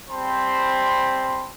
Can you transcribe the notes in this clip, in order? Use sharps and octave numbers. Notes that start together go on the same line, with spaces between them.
G3 C4 C5 A5 B5 C6